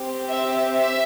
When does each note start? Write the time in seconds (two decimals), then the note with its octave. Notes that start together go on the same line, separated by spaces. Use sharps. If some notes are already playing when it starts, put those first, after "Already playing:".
Already playing: C4 G4
0.29 E5
0.75 E5